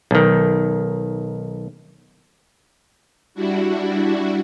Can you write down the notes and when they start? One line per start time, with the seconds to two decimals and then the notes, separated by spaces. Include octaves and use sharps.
0.11 B1 D#3
3.34 G3 D4 E4 F#4